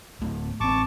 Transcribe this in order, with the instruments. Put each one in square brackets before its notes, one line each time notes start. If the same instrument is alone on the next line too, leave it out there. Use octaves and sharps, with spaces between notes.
[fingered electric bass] D1 A3
[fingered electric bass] A1 C4 [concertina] A5 C#6 D6